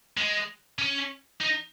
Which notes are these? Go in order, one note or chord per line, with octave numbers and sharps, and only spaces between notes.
G#3
C#4
D#4